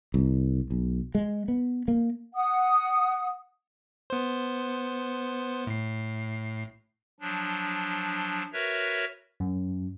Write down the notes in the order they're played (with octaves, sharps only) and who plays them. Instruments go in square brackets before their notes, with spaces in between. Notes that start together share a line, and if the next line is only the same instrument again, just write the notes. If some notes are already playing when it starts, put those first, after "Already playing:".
[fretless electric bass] C2
B1
G#3
B3
A#3
[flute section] F#5 D#6
[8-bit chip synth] B3 C5
A2 C7
[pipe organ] F3 F#3 D4
F#4 A#4 B4 C#5 E5
[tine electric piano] F#2